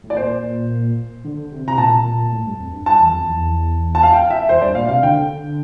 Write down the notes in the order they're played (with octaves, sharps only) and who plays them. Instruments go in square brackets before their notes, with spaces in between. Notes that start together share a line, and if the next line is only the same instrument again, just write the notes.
[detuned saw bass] A2
[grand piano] D5
[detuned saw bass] A#2 [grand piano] C5
[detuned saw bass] D3
C3
[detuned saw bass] C3 [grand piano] A#5
[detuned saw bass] A#2 [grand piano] A5
[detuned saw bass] A#2
A2
G2
F2
G2
[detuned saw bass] G2 [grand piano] A5
[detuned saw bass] E2
F2
E2
[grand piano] A5
F5
G5
E5
[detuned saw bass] E2 [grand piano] C5
[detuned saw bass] G2 [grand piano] D5
[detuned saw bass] A#2 [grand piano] F5
[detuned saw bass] C3 [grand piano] F5
[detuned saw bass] D3 [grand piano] G5